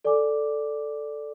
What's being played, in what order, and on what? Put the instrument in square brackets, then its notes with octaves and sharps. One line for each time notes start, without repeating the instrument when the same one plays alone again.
[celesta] A4 D5 G#5 D6